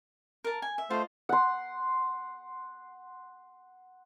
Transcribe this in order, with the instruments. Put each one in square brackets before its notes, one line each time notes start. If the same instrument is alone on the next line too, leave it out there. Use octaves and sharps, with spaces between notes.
[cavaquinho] A#4 A5
G#5
E5
[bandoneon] A3 C5 [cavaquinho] F4 D#5
[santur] F#5 C6